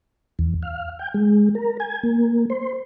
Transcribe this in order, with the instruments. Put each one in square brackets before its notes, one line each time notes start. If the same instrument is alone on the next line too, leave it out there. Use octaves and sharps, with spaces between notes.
[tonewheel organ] E2
F5
G5
G#3
A#4
G#5
A#3
C5